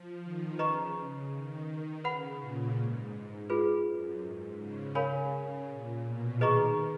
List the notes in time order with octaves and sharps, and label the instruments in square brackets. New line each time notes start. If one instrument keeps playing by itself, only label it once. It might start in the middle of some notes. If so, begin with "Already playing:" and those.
Already playing: [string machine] F3
D#3
[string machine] C#3 [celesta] B4 D#5 A#5 C#6
[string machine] C#3
D#3
D#3
[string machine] C#3 [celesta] B4 F#5 B5
[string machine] A#2
G#2
[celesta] F4 G#4 B4
[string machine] F#2
G#2
C#3
[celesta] A#4 C#5 F5 G#5 B5
[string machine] A#2
B2
[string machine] D#3 [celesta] G#4 B4 D#5 A#5 C#6